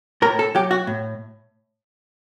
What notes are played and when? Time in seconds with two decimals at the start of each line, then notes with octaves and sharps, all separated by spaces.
0.22 A2 A#4
0.39 A4
0.55 F#3 G4
0.71 F#4
0.87 A2